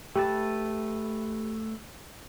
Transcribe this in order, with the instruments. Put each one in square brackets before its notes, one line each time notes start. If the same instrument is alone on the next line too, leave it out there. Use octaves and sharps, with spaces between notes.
[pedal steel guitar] A3 B4 A5 [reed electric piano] G4